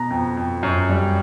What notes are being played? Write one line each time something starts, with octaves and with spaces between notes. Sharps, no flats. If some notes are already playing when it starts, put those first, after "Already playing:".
Already playing: B2 A#5
F2
F2
F#2
G3